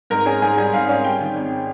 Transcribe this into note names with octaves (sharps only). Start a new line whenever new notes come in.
G#2 A#4 A#5
C#4 G#4 G#5
G#2 G#4 G#5
G3 G#4 G#5
G#2 F5
C#4 F5
G3 G5
D#3
G#1